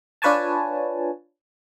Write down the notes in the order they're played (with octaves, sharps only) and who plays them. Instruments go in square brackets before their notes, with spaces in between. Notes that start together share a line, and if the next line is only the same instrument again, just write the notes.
[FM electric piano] D4 F4 B4 C#5 G#5 A5